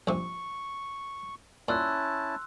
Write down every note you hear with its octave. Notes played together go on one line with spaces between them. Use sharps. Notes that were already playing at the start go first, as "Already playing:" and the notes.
A#1 C3 C#6
A#2 C#4 E4 A5 C6 E6 F#6